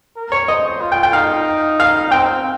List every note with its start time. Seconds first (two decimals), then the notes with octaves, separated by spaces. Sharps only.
0.16 A#4
0.32 C#5
0.48 C5 D#5
0.82 F4
0.92 G5
1.03 G5
1.13 D#4 F5
1.80 F5
2.11 C4 G5